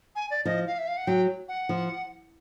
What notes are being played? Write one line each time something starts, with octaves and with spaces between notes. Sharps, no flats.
G#5
D5
F3 D#5
F5
E5
F5
F#5
F#3 G5
F#5
F3